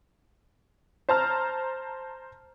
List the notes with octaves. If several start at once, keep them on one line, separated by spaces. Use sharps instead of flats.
C5 A5 A#5 F6